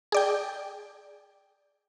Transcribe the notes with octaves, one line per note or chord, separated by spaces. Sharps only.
G#4 D5 G5